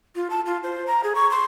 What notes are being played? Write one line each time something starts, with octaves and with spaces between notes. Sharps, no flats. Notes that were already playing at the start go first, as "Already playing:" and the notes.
F4
A5
F4
C5
A#5
G#4
C#6
C6